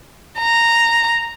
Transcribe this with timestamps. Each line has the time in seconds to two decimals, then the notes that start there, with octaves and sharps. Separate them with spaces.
0.39 A#5